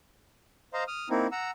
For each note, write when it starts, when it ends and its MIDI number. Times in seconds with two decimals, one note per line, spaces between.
0.74 0.84 72
0.74 0.84 75
0.74 0.84 77
0.74 0.84 82
0.74 0.84 84
0.87 1.09 87
0.87 1.09 89
1.10 1.27 58
1.10 1.27 60
1.10 1.27 63
1.10 1.27 64
1.32 1.51 78
1.32 1.51 82
1.32 1.51 88